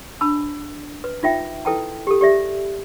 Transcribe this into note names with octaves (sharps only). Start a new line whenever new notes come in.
D4 A5 B5 E6
B4
D#4 F4 E5 G5
E4 A4 B4 G5 A5 A#5
G4 A4
G4 D5 E5